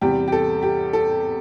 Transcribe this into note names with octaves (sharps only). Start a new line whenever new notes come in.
E2 C3 G3 G4
G4
A4
G4
A4